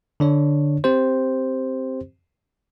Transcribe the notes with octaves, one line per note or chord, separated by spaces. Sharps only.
D3 D4 C#5
C4 G4 C5